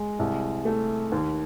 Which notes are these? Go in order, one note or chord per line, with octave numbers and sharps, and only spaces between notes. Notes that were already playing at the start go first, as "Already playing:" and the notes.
Already playing: G#3
C2
A3
D#2